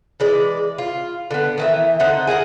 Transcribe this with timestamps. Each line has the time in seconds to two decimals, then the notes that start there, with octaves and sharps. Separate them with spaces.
0.20 E3 G#3 D5
0.78 F4
1.31 D3 B3
1.58 D#3 E3 E5
2.00 D3 D#4 C5 F#5
2.27 G#4 A#4 F5 F#5